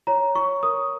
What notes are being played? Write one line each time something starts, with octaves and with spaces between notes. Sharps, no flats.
C#5 A#5
C#5 C#6
A#4 D#6